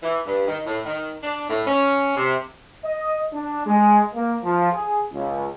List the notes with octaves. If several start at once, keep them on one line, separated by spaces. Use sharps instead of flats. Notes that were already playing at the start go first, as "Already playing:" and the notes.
E3
G2
D#3
A2
D#3
D4
A2
C#4
C3
D#5
D4
G#3
A#3
F3
G#4
C#2